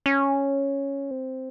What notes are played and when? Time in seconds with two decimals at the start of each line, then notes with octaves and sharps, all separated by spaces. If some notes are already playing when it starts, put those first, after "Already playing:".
0.06 C#4
1.11 C4